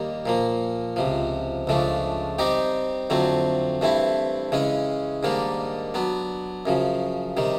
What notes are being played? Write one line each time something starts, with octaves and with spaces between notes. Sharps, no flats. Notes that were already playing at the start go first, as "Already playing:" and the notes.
Already playing: D#2 D#3 G3 A#3
A#2 F3 A#3
C#2 C3 F3
C#2 C#3 F3 A3 D4
G3 C4 D#4 G4
F2 D3 F#3 A3 C4
G2 E3 A3 C4 E4
C#3 E3 G#3 C#4
G#2 D#3 G3 A#3 D4
F#3 B3 D4
F#2 C#3 F3
C3 D#3 G3